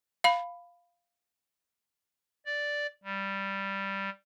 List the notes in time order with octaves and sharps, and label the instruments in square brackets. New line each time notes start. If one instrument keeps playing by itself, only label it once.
[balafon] F5 B5
[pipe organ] D5
G3